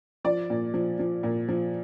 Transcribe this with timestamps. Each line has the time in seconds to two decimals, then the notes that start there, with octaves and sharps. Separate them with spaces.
0.24 F3 D5
0.50 A#2
0.74 F3
0.99 F3
1.23 A#2
1.49 F3